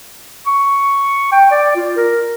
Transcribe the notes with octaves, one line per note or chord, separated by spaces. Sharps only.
C#6
G5
D5
F4
A#4